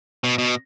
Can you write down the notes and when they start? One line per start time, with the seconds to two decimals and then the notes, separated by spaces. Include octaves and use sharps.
0.24 B2
0.38 B2